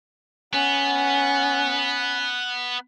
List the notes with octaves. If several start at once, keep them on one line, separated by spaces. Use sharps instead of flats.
B3 C#4 F#5